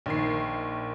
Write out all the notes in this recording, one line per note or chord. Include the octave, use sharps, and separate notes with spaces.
A#1 D#3 C7